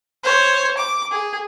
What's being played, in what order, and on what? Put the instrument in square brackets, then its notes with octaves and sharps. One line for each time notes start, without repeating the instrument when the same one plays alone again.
[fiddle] C5 C#5
D6
G#4